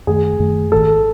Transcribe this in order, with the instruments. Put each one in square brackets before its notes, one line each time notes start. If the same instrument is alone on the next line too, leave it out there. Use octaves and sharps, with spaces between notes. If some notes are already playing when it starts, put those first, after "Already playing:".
[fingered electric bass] F#2 D#3 A3 [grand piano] G#4
[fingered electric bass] F#2 D#3 A3
[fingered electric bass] G#1 G#2 D#3 [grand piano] A4